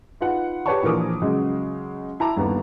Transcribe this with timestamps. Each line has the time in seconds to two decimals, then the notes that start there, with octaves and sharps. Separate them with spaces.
0.21 D#4 F4 B4 F#5
0.66 G4 B4 C#5 D5 A5 C#6
0.83 A#1 E3 F3 A#4 D6 D#6
1.22 C#3 F#3 G#3
2.20 E4 A5 A#5 D6
2.37 G1 D#2 B3